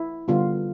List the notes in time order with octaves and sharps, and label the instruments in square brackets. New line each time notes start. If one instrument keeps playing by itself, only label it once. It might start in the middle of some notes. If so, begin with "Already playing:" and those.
Already playing: [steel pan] E4
D3 G3 B3 F4